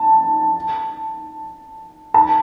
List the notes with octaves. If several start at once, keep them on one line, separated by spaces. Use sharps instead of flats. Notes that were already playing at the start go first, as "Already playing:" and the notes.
Already playing: A5
A5